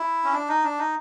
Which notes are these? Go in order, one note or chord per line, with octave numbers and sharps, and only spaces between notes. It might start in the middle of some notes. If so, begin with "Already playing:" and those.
Already playing: E4
C#4
D4
D#4
D4
D#4